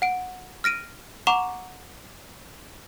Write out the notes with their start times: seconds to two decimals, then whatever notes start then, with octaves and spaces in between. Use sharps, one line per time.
0.02 F#5 D7
0.64 F6 A#6 D7 D#7
1.27 F#5 A#5 C#6 D6 E7 F7